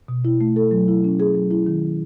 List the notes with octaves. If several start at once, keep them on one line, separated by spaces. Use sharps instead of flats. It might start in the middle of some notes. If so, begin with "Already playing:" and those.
B2
E4
A3
A4
F#3
E4
C#4
G#4
F#3
E4
D#3